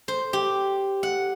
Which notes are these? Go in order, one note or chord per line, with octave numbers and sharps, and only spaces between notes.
C5
G4
F#5